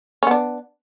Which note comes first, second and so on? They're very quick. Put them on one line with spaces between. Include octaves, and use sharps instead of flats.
C#4 B3 D4